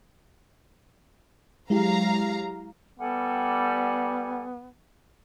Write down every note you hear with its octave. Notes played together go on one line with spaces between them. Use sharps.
F#3 G#3 E4 G4 F5 A#5
G3 B3 A4 F#5 G#5